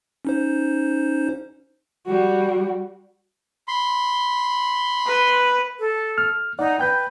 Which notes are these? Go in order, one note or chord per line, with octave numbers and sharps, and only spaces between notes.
C#4 D#4 C5
G3 F#4
B5 C6
B4
A4
F6
D#4 D5 F#5
B4 G5 G6